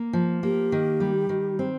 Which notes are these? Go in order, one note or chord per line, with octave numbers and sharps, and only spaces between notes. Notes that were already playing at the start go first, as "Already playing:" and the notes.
Already playing: A#3
F3
A#3 G4
D#3
G3
D#3
C4